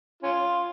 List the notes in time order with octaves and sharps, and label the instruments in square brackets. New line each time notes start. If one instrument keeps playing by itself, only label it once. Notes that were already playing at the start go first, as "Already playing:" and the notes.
[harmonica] C#4 F4